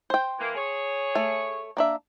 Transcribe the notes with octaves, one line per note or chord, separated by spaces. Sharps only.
C5 G5
E3 A#3
G#4 C#5
A3
A#3 D4 E5